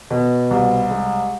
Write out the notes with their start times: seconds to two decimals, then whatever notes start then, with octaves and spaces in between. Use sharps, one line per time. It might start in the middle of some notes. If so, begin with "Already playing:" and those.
0.11 B2
0.51 C2
0.90 G#3